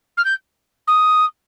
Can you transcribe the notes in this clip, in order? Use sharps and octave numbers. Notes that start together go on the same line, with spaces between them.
F6
G6
D#6